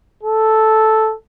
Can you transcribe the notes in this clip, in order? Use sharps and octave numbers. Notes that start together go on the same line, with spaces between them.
A4